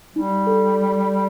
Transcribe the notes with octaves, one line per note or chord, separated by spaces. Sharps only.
G3 D#4
A4